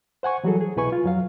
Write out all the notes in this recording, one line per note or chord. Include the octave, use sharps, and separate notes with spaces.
C5 F#5 G#5 C#6
E3 F#3 G3 F#4 G#4 A4
G#4
C2 B2 E4 B4 G#5 C#6
F4
F2 F#3 F5